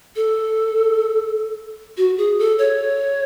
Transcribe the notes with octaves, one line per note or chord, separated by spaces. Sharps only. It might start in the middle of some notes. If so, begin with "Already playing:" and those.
A4
F#4
G#4
A4
C#5